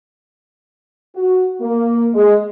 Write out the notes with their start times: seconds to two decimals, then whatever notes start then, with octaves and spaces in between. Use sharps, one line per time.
1.16 F#4
1.61 A#3
2.15 G#3